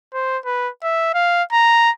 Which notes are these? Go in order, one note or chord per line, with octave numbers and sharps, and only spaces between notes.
C5
B4
E5
F5
A#5